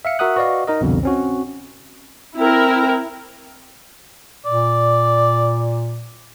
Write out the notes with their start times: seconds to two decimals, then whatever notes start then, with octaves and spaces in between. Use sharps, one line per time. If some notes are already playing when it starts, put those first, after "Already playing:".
0.05 E5 F5 C#7
0.19 F#4 A#4 E5 F#5 D#6 F#6
0.36 F#4 B4 D5 D#5 F5
0.67 D#4 A#4 D#5
0.81 C2 F2 B2 D3
1.03 C4 C#4 F#4
2.37 C4 E4 A#4
4.46 A#2 D5